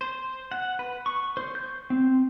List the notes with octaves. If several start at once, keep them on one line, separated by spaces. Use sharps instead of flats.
C5
F#5
B4
C#6
C5
G6
C4